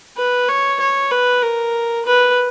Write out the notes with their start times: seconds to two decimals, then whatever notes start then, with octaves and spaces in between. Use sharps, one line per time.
0.17 B4
0.49 C#5
0.80 C#5
1.11 B4
1.42 A#4
2.05 B4